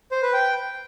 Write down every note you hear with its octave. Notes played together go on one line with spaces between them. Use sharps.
C5
B4
G5